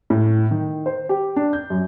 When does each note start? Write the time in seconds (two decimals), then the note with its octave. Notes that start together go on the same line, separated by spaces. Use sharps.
0.10 A2
0.51 D#3
0.86 C5
1.09 G4
1.36 D4
1.53 G6
1.70 F#2